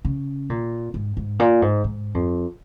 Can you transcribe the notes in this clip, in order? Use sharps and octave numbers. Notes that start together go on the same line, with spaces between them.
C#3
A#2
G#2
G#2
A#2
G#2
G#2
F2